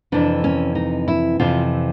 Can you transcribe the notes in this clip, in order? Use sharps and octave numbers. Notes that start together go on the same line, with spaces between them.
F2 C3 E3 D4
C#4
D#4
E4
F2 C3 E3 F4